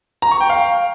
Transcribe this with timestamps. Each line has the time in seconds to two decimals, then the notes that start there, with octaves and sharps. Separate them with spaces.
0.22 A#5
0.31 C#6
0.41 G5
0.50 F5